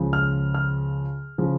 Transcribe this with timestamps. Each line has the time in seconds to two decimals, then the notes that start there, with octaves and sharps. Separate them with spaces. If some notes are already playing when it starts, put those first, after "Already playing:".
Already playing: C#2 C#3 F3
0.13 F6
0.54 F6
1.38 C#3 F3